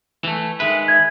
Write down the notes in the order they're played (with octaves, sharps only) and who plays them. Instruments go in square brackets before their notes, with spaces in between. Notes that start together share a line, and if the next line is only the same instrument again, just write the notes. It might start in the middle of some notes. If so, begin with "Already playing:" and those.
[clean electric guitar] E3 A3
[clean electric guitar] D#3 G#3 B4 [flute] E5
[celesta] G#6